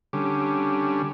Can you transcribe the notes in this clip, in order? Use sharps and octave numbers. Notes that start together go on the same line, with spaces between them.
D3 G3 C#4